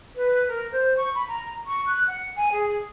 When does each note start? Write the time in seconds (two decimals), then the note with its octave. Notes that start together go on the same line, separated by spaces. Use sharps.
0.16 B4
0.48 A#4
0.72 C5
0.97 C#6
1.15 B5
1.28 A#5
1.67 C#6
1.86 F#6
2.08 F#5
2.37 G#5
2.52 G#4